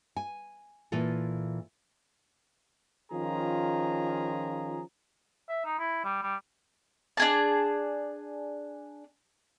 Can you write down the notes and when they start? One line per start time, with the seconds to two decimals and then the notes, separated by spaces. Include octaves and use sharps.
0.16 G#5
0.92 A#2 E3 F4 A4
3.12 D#3 F3 C#4 F4 G#4 A#5
5.49 E5
5.65 D#4
5.79 E4
6.04 G3
6.22 G3
7.17 D4 G#4 A5